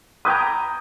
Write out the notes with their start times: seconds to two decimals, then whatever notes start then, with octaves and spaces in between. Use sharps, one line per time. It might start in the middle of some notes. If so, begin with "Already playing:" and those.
0.25 B4 G5 A#5 D#6 G6 G#6